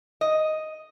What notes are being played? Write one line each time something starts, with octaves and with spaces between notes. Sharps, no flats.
D#5